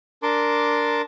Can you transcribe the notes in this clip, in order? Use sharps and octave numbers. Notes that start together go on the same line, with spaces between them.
D4 A#4 A5 C6 D6